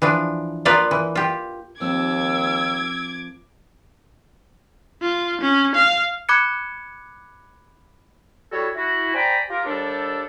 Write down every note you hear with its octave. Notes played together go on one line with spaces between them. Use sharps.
E3 F3 D4
F3 A#3 F4 B4 D5 F5
E3
F4 G4
D#2 F3 A#3 C4 D6 E6 G#6
F4
C#4
F5
B5 D6 F#6 G#6 C#7
G3 E4 F#4 A4 C#5
E4 F#4
C5 D5 G5 G#5 A#5 B5
F4 G4 A#4
D#2 G3 D4 G4 A4